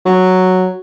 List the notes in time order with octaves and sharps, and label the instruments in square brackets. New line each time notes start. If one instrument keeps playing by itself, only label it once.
[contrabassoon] F#3